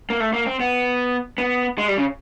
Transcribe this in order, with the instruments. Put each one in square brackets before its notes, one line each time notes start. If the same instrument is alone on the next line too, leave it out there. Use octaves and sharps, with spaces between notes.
[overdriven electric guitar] A#3
A3
A#3
C4
B3
B3
G#3
G3
C#3